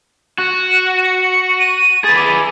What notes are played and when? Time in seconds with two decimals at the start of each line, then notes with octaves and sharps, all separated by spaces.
0.38 F#4 F#6
1.03 C#7
1.59 D#7
2.04 G#4 B4 A6
2.16 D6